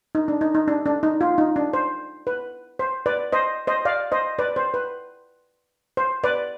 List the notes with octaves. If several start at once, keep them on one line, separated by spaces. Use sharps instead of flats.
D#4
D4
D#4
D#4
D4
D4
D#4
F4
D#4
D4
C5
B4
C5
B4 D5
C5 D#5
C5 D#5
D5 F5
C5 D#5
B4 D5
C5
B4
C5
B4 D5